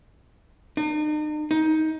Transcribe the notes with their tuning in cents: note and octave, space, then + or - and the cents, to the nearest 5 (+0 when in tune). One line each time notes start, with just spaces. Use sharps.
D#4 -45
D#4 +15